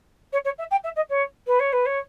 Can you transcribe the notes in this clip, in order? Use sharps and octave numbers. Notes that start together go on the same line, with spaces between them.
C#5
C#5
E5
G5
E5
D#5
C#5
B4
C#5
B4
C#5